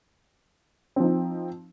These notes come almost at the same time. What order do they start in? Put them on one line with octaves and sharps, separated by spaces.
C4 F3 D#4